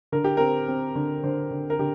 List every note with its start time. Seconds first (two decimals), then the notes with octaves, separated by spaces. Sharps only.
0.12 D3 A#4
0.24 G4
0.37 C4 A#4
0.68 C4
0.95 D3
1.23 D3 C5
1.51 D3
1.70 A#4
1.79 D3 G4